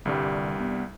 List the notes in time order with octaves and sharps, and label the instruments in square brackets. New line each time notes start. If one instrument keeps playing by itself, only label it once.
[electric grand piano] C2 G2 G3 [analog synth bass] D3
[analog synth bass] B3